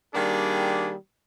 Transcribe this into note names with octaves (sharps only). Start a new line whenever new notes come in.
D#3 G3 A#3 D4 G#4